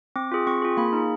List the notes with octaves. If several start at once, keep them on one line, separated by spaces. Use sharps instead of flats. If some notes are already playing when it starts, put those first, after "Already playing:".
C4 D6
F4 G#4
C4 C#6
F4 G#4
A#3 B5
D#4 G#4